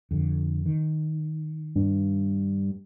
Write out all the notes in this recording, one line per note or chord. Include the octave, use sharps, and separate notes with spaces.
F2 D3
D#3
G2